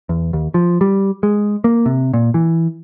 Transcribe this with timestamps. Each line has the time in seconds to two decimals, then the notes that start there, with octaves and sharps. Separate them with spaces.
0.09 E2
0.33 D#2
0.54 F3
0.81 G3
1.23 G#3
1.64 A#3
1.86 C3
2.14 A#2
2.34 E3